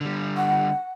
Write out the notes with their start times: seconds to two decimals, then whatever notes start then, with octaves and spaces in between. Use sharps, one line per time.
0.01 D3 G3
0.36 F#5